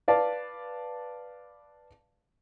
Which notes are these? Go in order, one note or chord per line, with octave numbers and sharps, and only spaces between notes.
B4 D5 F5 A5